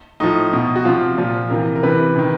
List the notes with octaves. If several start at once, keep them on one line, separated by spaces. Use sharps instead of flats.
A2 F3 D#4
B2
F#4
C3 F3 F4
A#2 F3
C3 E3 A#4
A#4
C3 E3 B4
C3 D#3